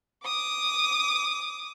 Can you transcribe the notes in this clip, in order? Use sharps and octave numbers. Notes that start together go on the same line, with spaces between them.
D6 D#6